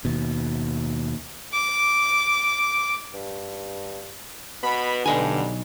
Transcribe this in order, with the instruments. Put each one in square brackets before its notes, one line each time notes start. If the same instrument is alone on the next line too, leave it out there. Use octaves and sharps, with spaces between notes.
[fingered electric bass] D#2 B2
[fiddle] D6
[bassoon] G2
[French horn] B2 [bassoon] B3 [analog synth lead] B5
[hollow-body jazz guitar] B1 D#5 G#5 [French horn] G2 [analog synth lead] D3